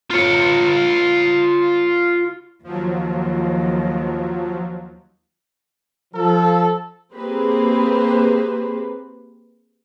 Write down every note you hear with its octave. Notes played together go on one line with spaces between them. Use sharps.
F4 C#5
D#2 F3 F#3
F3 A4
A#3 C4 G4 G#4 B4 C5